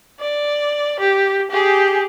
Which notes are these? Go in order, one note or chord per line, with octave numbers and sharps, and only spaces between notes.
D5
G4
G4 G#4